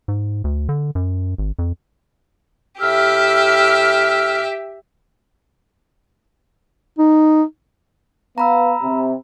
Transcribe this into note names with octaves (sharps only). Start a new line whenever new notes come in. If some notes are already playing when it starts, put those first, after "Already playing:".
G#2
D2
D3
F#2
G#1
F2
A2 G4 E5 E6 F6
D#4
B3 F5 A#5 B5 E6
C3